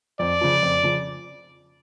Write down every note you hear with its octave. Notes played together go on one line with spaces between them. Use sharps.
F2 D5
C#3 F3
F2
C#3 F3